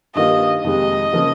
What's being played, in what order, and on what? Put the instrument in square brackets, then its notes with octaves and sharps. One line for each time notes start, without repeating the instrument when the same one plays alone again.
[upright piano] G2 D#3 A#3 F4 [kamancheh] D#5
[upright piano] F2 C3 D#3 G#3 [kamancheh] D#5
[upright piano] C#3 F3 A#3 D#4